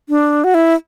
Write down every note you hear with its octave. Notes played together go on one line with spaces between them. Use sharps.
D4
F#4
E4